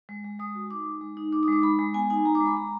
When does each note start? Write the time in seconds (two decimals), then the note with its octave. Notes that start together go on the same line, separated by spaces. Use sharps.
0.09 G#3
0.24 G#3
0.40 G#3 D#6
0.55 F#4
0.70 D#4 D6
0.86 G#3
1.01 G#3
1.17 D#4
1.32 D#4 D6
1.43 D#6
1.48 G#3 D6
1.63 G#3 B5
1.79 G#3
1.94 B3 G#5
2.10 D#4 G#5
2.25 G#3 A#5
2.35 D6
2.40 G#3
2.46 B5
2.56 G#3 A#5